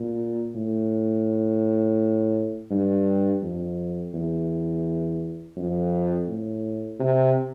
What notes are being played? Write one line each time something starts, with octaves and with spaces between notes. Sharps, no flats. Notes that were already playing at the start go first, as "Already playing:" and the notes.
Already playing: A#2
A2
G2
F2
E2
F2
A2
C3